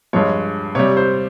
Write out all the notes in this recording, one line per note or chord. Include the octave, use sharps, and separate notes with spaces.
G2 F3 G#3 C#5
C3 G3 C#5
C5